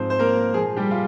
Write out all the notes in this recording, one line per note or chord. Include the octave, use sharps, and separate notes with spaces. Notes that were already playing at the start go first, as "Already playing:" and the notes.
Already playing: G#2 F3 C4 C5
C5
A#3 A#4
A#2 F3 G#3 G#4
G3 G4
F4